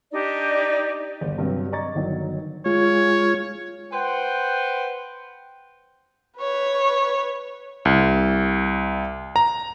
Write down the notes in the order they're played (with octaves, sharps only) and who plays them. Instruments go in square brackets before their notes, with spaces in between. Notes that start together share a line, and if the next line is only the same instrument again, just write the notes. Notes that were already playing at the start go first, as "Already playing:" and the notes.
[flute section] D4 D#4 G4 D5
[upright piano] G1 D#2
G2 C3 F#3
D5 D#5 A#5 C#6 G#6 A6
G1 D#3 F#3
[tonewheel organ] G#3 F4 [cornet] C#5
[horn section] B4 C5 F#5 G5
[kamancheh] B4 C#5
[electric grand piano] C2
A#5